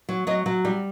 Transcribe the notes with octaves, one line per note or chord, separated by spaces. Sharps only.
F#3
F#3 D#5
F#3
G3